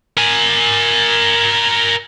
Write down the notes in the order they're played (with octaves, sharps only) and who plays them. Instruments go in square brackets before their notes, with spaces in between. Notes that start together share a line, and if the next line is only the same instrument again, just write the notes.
[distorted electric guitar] A#4 G#5